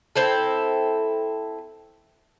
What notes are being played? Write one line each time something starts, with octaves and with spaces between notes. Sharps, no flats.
C4 E4 A4